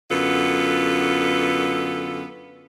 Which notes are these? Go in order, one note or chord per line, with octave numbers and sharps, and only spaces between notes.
F#2 D3 B3 F4 A4